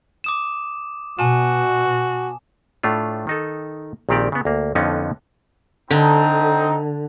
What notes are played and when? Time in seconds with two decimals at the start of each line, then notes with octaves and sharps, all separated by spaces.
0.24 D6 D#6 E7
1.19 B2 F#4 G#5 A5 E7
2.83 A2 A3 D4 F4
3.27 D#3 D#4 A4
4.09 A#1 A#2 D#3 C4 G4 D5
4.32 C#3 B3
4.45 D2 A#3
4.75 F2 D3 F3 B3 C#4 D#4
5.90 D3 C4 D#4